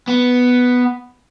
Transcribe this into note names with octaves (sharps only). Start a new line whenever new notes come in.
B3